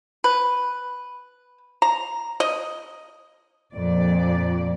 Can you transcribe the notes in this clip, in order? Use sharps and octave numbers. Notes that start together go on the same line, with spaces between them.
B4
A#5
D#5
F2 A#2 D5